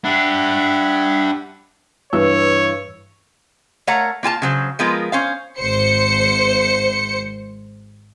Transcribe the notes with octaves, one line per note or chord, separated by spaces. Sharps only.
D4 G4 E5 F#5 B5
G2 E3 C#5 E6
A3 A#4 C#5 F5 F#5 A#5
A#3 F4 G#5 A5
C#3 F#3 C5
F3 G#3 B3 F4 A#4
C#4 C5 F5
G#1 C5 C#7